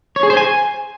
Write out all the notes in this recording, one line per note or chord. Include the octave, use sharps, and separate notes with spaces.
C#5
G#4
C5
G#5